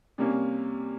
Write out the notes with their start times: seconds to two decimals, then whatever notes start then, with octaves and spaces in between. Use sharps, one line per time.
0.18 C3 G3 A#3 C#4